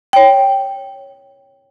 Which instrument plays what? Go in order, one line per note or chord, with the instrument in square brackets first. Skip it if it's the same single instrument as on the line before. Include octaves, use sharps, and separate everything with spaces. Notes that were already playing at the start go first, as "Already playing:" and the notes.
[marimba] C#5 G5